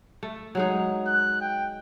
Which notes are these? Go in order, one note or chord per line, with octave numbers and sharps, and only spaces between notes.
A3
F#3 G#3 D#4
F#6
G5